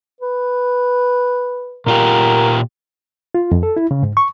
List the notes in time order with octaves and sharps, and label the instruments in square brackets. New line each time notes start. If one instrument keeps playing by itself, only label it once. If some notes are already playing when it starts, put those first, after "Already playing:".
[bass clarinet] B4
[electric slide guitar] A#2 F4 G4 [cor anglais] A#4
[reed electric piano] F4
F2
A4
E4
C#3
G#2
C#6